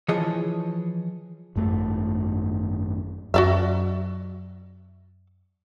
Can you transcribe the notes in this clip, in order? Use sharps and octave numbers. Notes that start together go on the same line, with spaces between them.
E3 F3 G#4 C#5 D#5
G#1 F#2 A3
F#2 F#4 D5 E5